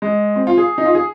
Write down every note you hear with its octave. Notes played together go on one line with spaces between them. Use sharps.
G#3
C4
F4
G#4
D#4
F4
G#4